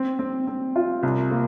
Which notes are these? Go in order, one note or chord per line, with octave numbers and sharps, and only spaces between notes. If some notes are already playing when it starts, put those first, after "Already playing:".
Already playing: C4
C4
C4
F4
C2
A#3